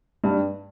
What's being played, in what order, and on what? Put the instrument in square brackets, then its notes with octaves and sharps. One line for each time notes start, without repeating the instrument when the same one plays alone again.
[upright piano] G2